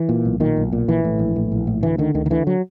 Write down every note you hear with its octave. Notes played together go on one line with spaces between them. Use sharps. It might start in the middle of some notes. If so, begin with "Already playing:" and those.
Already playing: E3
A#2
B1
A#2 D#3
B1
A#2
A#1 E3
A2
A#1
A2
A#1
A2
D2 E3
D3 D#3
D2 D#3
D#3
D3 E3
F#3